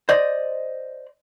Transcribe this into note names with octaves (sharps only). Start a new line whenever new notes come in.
C5 D5 D#5